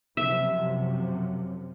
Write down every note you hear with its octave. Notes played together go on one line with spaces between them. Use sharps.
F#2 C3 F3 E5